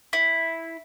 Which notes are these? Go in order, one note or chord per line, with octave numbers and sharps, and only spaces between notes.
E4